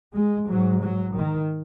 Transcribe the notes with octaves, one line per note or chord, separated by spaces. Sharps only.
G#3
G#2 F#3
F#3
D#3